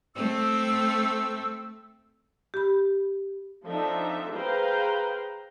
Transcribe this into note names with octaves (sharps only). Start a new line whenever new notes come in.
A3 C4 E6
G4 B5
F3 C4 D4 D#4 A4 E5
G#4 B4 C5 F5 G5 A#5